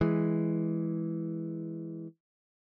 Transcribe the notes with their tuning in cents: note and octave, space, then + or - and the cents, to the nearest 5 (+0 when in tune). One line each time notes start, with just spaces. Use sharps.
E3 +0 G#3 +0